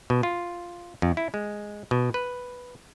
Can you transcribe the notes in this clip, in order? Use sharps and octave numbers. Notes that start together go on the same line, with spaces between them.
B2
F4
F2
E4
G#3
B2
B4